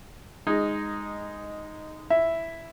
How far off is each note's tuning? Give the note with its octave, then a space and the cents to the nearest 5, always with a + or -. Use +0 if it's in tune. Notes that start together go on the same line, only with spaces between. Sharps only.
G#3 -10 D#4 +0
E4 +0 E5 +0